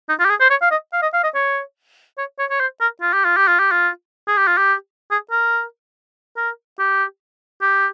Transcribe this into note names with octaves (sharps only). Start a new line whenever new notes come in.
D#4
F4
G4
G#4
C5
C#5
F5
D#5
F5
D#5
F5
D#5
C#5
C#5
C#5
C#5
C5
A#4
F4
G4
F4
G4
F4
G4
F4
G#4
G4
F4
G4
G#4
A#4
A#4
G4
G4